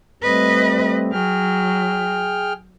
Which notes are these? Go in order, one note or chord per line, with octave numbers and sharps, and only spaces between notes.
G3 A3 C4 B4 D#5
F#3 G#4 G5 F6